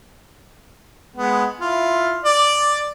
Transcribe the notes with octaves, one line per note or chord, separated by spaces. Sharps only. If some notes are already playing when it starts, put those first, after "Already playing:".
G#3 B3
E4 F4
D5